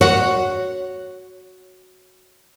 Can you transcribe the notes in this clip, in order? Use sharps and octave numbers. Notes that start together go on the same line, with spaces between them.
F#4 C#5 F#5